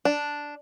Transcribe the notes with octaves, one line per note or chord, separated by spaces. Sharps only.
D4